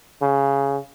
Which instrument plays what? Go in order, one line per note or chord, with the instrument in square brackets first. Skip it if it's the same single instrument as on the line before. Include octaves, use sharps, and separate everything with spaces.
[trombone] C#3